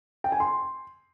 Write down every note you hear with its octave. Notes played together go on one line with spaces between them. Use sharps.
G5
G#5
C6